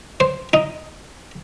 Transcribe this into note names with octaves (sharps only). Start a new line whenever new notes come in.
C5
D#4